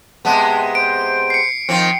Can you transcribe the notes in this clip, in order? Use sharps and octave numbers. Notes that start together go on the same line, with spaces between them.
C3 G#3 B3 A5
C5 D7
C7 C#7
D#3 F3 C4 G5